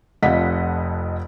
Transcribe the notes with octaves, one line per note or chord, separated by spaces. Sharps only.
F1 F2 F4 D#5 F#5 B6